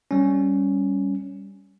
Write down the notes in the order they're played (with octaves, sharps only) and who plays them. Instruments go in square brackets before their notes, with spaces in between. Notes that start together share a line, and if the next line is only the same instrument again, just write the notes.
[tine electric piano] G3 C#4